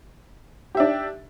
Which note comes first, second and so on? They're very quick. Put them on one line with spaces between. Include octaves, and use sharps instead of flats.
G4 E5 D4